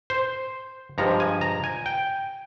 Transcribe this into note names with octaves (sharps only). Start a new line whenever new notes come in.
C5
G2 F3 G#3 A#5
G#5
A#5
G#5
G5